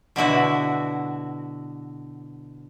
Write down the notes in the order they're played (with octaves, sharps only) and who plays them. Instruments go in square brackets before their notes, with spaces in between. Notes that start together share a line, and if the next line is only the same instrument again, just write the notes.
[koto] B2 D3 E4 F#4